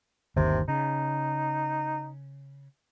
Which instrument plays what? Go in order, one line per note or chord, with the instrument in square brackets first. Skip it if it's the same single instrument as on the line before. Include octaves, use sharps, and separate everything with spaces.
[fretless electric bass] G1 D#2 D#3 [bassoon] C3
[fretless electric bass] C#3 [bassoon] D#4